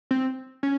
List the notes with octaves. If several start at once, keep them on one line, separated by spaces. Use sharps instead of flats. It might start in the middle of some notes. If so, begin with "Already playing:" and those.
C4
C#4